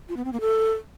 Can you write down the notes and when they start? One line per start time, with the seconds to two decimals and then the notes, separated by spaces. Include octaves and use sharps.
0.09 F4
0.17 B3
0.25 C4
0.33 A#3
0.41 A4